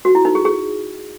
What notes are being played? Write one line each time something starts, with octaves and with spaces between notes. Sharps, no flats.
F#4
E4
D#4
G#4
G#4